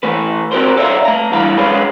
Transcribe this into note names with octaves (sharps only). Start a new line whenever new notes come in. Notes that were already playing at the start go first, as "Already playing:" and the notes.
E3 A3 B4
C4 F#4 G4 A#4 C5
A4 C#5 D5 E5 F5 A#5
A3 A#5
G2 E3 F5 B5
F#2 G#3 G#4 B4 C#5